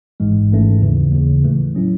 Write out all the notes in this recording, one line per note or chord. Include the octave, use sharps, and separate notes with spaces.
A1 G#2 E3 G#3
G#1 G#2 E3 A3 C#4
D#2 C#3 E3
D#2 C#3 E3
A2 E3 A3
F#3 C#4 E4